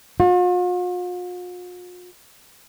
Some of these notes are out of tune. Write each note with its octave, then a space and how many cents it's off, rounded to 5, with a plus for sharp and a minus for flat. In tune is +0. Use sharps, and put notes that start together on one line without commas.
F4 +45